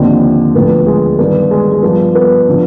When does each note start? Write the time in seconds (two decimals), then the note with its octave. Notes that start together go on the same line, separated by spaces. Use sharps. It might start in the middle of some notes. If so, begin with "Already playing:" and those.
Already playing: D#2 D3 F3 C4
0.55 D2 D3 F3 B3
0.87 G#3
1.19 G2 D#3 B3
1.51 G#3
1.72 G#3
1.83 G2 F3 B3
2.15 B3
2.49 D3 F3